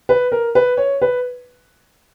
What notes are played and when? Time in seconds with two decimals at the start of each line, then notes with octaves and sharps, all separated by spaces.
0.09 B4
0.32 A#4
0.55 B4
0.77 C#5
1.02 B4